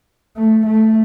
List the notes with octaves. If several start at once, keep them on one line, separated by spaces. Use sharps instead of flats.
A3
A3